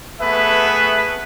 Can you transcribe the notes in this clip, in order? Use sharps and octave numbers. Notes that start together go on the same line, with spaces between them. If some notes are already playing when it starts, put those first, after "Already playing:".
A3 B3 G#4 B4 E5